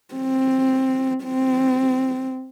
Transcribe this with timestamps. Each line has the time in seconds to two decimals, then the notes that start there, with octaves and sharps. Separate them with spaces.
0.14 C4
1.24 C4